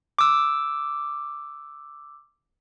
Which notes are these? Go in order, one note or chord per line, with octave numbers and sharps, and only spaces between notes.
D6 E6